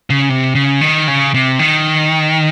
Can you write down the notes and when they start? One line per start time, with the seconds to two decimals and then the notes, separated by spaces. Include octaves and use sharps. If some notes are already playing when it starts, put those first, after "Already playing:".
0.10 C#3
0.29 C3
0.55 C#3
0.81 D#3
1.08 C#3
1.34 C3
1.59 D#3